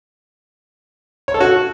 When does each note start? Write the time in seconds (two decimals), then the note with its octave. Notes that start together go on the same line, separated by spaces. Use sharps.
1.28 C#5
1.34 A4
1.40 F#4